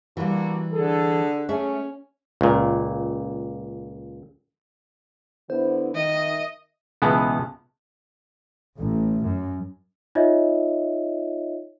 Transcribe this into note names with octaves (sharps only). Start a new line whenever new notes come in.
D3 E3 G3 A#3 F#4
D3 G#4 A4
A3 C#4 G#4 E5
C#2 A#2
D3 B3 E4 C5
D#3 D#5 E5
C#2 B2 E3 G#3 B3 A5
A1
F#2
D#4 F4 C#5 D#5 E5